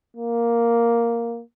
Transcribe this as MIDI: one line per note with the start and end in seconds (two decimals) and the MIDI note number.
0.17 1.42 58